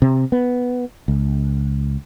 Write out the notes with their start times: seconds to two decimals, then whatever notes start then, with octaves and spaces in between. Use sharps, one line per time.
0.02 C3
0.32 B3
1.08 C#2